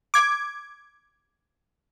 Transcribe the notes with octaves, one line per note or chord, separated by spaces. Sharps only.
D6 G#6